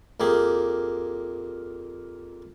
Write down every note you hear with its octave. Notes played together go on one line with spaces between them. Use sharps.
F2 A#3 G4 G#4